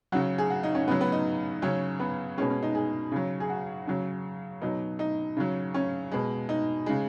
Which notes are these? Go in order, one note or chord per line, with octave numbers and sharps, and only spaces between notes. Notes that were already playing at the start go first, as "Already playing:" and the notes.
C#3 F#3 F#4
G#4
F#4
D#4
C#4
C#3 F#3 B3
B3
D#4
C#3 F#3 C#4
B3
B2 G#3 C#4
C#4
D#4
G#4
C#3 F#3
G#4
F#4
C#3 F#3
B2 F#3 D#4
D#4
C#3 F#3
C#4
B2 G#3
D#4
C#3 G#3